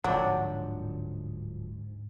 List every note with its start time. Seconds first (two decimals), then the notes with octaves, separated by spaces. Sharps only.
0.04 D1 G#2 D3 F3 F#3 D4 D5 G5